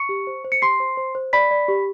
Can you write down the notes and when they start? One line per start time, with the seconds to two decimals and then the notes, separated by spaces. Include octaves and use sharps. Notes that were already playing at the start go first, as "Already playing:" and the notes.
Already playing: C#6 C#7
0.09 G4
0.27 C5
0.45 C5
0.52 C#7
0.62 G4 C6 C7
0.80 C5
0.97 C5
1.15 C5
1.33 D5 B5 B6
1.51 D5
1.68 G4